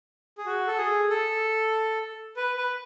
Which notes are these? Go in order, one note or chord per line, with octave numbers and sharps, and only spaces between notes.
G#4
F#4
A4
G#4
A4
B4
B4